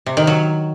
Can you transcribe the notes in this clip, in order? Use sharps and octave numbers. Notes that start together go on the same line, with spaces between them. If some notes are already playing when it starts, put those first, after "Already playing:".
C3
D#3
F#3